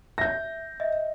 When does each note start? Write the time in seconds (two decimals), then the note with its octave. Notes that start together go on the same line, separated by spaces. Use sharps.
0.18 E5 G6 A#6
0.80 D#5 E5